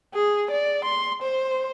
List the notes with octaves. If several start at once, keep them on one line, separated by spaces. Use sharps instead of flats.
G#4
D5
C6
C5